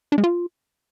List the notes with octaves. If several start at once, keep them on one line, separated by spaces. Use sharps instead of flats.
D4
G#3
F4